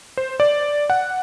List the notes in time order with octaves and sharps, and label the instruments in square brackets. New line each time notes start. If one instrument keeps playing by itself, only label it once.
[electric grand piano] C5
D5
F#5